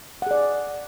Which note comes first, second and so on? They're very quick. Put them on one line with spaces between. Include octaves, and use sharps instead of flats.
F#5 G#4 D5